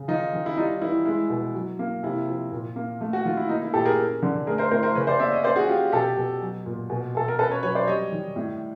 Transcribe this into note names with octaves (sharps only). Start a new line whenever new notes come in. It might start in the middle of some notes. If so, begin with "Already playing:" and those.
Already playing: C#3
D#3 D#4 F4
D#3
E4
G3 D#4 F4
E3 E4
G#3 E4
B2
F#3
A#3
C3 E4
F3
A#2
A#3
A3
F#4
D#3 F4
E4
A#3 D#4
E4
A#2 G4 A4
G#4 A#4
C#4
D3
A3 G#4 A#4
A#4 C5
A2 A#4 C5
A#4 C5
C#3 B4 C#5
C5 D5
A#3 D5 E5
C#5 D#5
C#4 C5 D5
F#4 G#4
C#4 F4 G4
B2 G4 A4
B2
F#3
A#2
B2
B2 A4
A#4
C#4 A4 B4
B4 C#5
F#3 B4 C#5
C5 D5
G3 C#5 D#5
D#3
A2